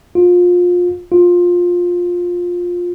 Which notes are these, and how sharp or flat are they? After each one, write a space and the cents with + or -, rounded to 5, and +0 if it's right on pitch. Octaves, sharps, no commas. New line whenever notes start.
F4 +25
F4 +15